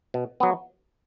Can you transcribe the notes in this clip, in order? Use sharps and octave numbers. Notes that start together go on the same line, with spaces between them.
B2
F#3 B3